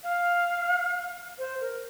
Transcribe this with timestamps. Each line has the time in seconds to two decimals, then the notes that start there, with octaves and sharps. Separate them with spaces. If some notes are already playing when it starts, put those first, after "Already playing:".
0.04 F5
1.38 C5
1.61 A#4